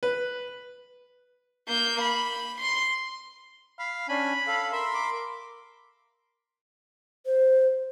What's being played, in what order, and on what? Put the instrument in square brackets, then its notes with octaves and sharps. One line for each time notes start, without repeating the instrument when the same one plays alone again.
[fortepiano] B4
[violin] A#3 G6
B5
C6
[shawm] F5 [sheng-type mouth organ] B5
[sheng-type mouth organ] C#4 D4 G#5 [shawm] B5
[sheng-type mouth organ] A4 F5
[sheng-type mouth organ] A#4 B5 C6 [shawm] E5
[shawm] D6
[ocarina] C5